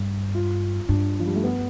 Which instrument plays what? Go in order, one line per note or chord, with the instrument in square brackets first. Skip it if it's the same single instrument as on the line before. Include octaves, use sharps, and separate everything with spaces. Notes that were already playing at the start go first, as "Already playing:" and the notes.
Already playing: [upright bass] G2
[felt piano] F4
[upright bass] G2 [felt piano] D4
[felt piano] F3
G3
A3
B3